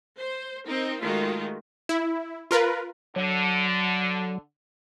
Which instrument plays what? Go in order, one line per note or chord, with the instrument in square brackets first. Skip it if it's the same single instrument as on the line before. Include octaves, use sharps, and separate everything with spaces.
[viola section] C5
C4 D#4 A#4
D#3 G#3 A3 F4 F#4
[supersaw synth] E4
F4 A#4 B4
[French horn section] D3 [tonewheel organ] F#3